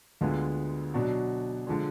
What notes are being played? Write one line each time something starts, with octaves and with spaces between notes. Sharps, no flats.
D2 D3 G#3 B3 F4
B2 F#3 D4 F#4
D3 F3 G#3